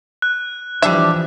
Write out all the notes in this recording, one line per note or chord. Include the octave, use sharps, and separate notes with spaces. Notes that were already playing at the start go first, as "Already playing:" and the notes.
F#6
E3 F3 G3 D4 E5